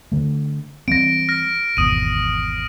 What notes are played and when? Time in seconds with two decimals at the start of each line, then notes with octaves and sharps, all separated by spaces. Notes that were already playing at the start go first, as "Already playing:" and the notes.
0.12 D3 A3
0.88 E3 G3 C4 A#6 D7
1.29 F6 A#6
1.77 G#1 E2 B2 D#6 D#7